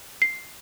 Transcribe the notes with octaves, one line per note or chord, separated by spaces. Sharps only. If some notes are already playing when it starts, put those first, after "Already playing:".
C7